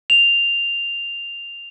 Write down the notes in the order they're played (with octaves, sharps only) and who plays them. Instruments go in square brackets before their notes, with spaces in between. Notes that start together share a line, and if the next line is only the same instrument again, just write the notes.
[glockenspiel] F7